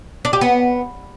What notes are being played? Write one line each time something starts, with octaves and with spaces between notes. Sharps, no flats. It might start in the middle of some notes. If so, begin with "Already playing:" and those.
D4
G4
B3